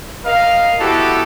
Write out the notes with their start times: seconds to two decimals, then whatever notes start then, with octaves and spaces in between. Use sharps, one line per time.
0.25 A#4 D#5 F5
0.79 B3 E4 F#4 G4 A4